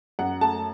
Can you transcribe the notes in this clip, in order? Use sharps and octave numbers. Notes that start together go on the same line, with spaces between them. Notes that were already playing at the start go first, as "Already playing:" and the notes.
F#2 F#5
A3 A5